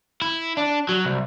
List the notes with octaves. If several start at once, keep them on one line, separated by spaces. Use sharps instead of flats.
E4
D4
F#3
C2